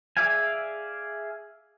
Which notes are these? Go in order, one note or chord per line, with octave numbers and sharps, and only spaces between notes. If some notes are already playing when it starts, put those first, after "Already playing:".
G#4 D5 E5 F5 G#5